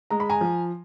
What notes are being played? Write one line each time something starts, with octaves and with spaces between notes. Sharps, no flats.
G#3 A#5
B5
G#5 A#5
F3